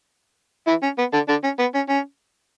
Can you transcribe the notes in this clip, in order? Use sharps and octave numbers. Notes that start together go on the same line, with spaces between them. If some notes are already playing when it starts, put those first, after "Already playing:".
E3 E4
C#4
B3
D3 D4
D3 D4
C#4
B3
C#4
C#4